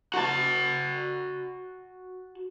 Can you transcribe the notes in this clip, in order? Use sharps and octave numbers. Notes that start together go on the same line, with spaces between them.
F#4 A5